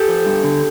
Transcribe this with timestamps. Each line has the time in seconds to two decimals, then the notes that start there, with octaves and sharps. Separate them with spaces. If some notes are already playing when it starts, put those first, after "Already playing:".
Already playing: G4 A4
0.08 F3
0.26 G2
0.44 D3